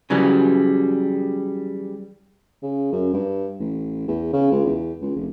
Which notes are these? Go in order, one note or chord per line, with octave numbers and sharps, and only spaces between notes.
C#3 E3 F#3 G3
C#3
F#2
G2
A1
E2
C#3
C#2
E2
C#2
F1